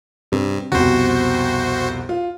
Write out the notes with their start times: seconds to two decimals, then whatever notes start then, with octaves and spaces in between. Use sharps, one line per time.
0.32 G2 C3
0.72 C2 F2 B2 F#4 C5
2.09 F4